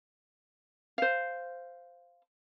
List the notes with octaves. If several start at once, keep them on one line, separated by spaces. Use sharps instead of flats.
C5 F5